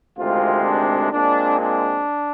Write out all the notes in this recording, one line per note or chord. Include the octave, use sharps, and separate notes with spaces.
D2 C3 D#3 G#3 C4 F4
D4
A#2 G#3 C4 D4
D4